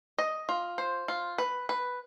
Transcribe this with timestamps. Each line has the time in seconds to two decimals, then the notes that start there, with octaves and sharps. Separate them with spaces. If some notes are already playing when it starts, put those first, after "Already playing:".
0.18 D#5
0.49 F4
0.78 C5
1.08 F4
1.38 B4
1.69 B4